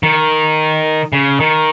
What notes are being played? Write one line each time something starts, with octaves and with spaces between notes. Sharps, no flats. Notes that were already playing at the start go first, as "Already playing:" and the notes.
D#3
C#3
D#3